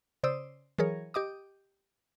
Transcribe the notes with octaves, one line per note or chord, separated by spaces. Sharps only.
C#3 C5 D5 D#6 E6
E3 F#3 G#4 A#4 C#5
G4 D#5 D6 D#6